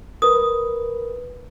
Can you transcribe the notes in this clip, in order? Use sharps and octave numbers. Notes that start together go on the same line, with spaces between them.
A#4 B4 D#6